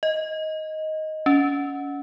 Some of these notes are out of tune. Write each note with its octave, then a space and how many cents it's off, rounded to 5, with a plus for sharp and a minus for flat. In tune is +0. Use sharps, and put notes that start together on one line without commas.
D#5 +10
C#4 +30